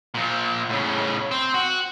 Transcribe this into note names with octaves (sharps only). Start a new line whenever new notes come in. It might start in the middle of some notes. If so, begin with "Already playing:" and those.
A#2 F3
A2 C#3
C4
F#4